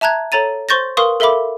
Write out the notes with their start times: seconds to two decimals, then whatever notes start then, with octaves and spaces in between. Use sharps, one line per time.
0.01 E5 A5 A#5 F#6 G#6
0.32 A4 C#5 A#5 A6 D#7
0.69 C5 C6 C#6 G6 A6 A#6
0.97 A#4 B4 F5 C6 C#6 D#6
1.20 A4 A#4 E5 F5 B5 D6